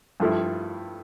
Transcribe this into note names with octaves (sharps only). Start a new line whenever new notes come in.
G2 F3 A3 E4